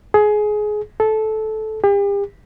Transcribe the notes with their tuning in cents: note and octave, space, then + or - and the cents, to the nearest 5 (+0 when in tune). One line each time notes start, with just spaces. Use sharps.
G#4 +20
A4 -15
G4 +40